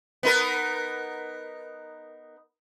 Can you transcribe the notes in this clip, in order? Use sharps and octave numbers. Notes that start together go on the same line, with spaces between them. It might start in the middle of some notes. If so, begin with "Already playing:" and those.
B3 D#4 A#4